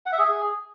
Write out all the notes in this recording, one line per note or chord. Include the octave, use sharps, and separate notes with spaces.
F#5
E5
G#4